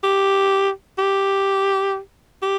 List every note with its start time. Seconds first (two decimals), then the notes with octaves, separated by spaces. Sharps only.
0.03 G4
0.98 G4
2.42 G4